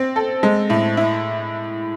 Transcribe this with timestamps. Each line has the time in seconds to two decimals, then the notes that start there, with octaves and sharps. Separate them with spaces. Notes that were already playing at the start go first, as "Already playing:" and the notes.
Already playing: C4
0.16 A4
0.43 G#3
0.70 A2
0.97 E4